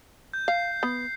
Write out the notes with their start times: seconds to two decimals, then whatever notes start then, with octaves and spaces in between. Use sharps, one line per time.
0.33 G6
0.48 F5 C7
0.83 B3